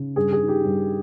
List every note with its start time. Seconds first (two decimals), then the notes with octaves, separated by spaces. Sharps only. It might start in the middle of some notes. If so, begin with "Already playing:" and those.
Already playing: C#3
0.16 G2 G#4
0.32 G#4
0.40 D#3
0.48 G4
0.65 G2